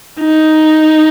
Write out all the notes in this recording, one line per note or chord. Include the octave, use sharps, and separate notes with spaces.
D#4